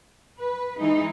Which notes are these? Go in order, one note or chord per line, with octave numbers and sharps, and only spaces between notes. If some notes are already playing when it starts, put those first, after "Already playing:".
B4
E3 G#3 D#4